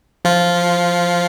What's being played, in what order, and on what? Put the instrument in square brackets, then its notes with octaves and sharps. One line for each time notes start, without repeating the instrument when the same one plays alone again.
[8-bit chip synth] F3 F4